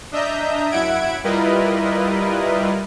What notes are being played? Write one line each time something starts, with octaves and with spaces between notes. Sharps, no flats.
D4 D#5 E5 A#5 G6
F#2 E4 E5 F#5 G#6 D7
G3 E4 F4 A#4 B4 D#5